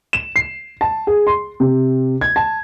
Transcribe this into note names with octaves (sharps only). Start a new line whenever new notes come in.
E7
C7
A5
G#4
C6
C3
G#6
A5